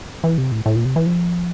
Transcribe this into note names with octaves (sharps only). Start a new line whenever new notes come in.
E3
C3
A2
A2
A#2
C3
E3
F3